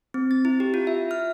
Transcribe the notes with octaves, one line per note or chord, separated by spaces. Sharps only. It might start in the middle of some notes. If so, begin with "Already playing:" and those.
C4
A6
E4
G4
F4
E5
F6